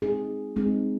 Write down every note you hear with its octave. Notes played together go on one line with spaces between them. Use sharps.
G#3 C4 D#4 G#4
G#3 C4 D#4 G#4